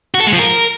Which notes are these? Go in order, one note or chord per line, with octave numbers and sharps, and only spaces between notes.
F#4
A4
G#3
F3
A#4